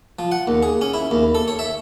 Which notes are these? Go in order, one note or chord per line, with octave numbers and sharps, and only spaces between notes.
F3
F#5
D#2
G#4
C#4
E4
D#2
A4
C#5
E5